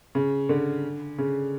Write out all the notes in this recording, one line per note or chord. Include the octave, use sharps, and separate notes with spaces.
C#3
D3
C#3